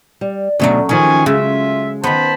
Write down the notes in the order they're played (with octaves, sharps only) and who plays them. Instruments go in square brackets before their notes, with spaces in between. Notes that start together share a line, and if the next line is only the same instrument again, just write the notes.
[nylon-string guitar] G3
[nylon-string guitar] D2 B2 D4 [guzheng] F#3 A3 C#4
[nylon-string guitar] D3 D#3 F3 [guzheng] C#4 [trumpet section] G#4 G#5 C#6
[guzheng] C#3 [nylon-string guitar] G#3 [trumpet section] F4 E5
[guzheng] D#3 B3 [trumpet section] C5 A5 B5